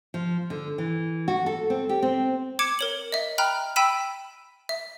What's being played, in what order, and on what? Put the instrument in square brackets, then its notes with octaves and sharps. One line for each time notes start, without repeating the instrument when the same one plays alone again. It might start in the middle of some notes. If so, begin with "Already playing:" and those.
[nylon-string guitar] F3
D3
E3
F#4
A4
C4
G4
C4
[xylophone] D6 G#6 C#7 D7 E7
A#4 C#5 F#7
D#5 E5
G5 A#5 B5 F6 F#6
G5 B5 E6 B6 D#7 E7
E5